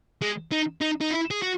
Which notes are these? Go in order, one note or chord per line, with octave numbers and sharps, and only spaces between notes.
G#3
D#4
D#4
D#4
E4
G#4
F#4